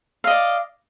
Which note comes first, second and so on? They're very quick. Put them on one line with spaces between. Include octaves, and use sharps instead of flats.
F5 D#5 D5